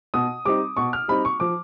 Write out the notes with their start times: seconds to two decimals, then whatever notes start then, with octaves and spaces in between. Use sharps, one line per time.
0.14 B2 D#6
0.45 G3 C4 D#4 D6
0.77 B2 C#6
0.93 F6
1.08 G3 C4 D#4 B5
1.25 C#6
1.40 F3 D6